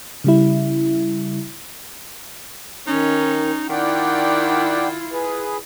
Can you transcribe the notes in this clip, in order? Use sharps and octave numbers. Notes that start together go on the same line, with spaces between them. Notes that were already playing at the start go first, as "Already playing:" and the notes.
C#3 G3 E4
D#3 C#4 D#4
D#3 E4 F4 D5 F#5 G5
G#4 B4